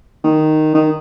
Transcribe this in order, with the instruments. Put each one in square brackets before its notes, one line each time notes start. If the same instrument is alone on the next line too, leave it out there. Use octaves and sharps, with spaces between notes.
[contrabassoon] D#3
D#3